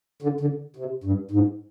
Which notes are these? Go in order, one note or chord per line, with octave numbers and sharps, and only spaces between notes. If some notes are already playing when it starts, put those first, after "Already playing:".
D3
D3
C3
G2
G#2